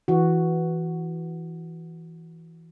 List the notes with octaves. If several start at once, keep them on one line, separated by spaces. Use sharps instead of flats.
E3 F#4